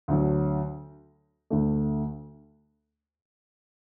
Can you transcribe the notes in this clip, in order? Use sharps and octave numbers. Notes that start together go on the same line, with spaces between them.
D2 D3 F#3
D2 D3 A3